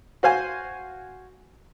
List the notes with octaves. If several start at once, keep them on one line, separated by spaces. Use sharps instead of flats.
F#4 C5 F5 G#5